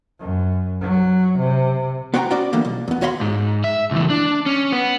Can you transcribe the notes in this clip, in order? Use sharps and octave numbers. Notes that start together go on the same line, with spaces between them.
F#2
F#3
C3
B3 F#4 C5 G5 A5 A#5
B3 C#4 F#4 C5 D5
D3 E3 G3 A#3
B1
E2 B3
D#2 F#4 C#5 F5 B5 C6
G#2
E5
C#2 E3
D4
C#4
B3